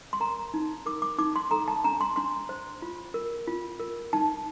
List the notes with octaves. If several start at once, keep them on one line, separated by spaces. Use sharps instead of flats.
C6
A#4 A#5
D#4
A#4 D6
D6
D#4 D6
C6
A4 A#5
A5
D4 A#5
C6
D4 C6
C5
F4
A#4
F4
A#4
D#4 A5